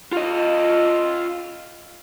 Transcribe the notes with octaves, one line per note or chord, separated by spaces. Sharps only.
F4 D#5